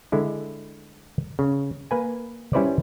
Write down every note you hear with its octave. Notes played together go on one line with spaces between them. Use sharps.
D3 G#3 E4
C#3
A#3 B4 G#5
G3 C#4 E4 B4 C5 D5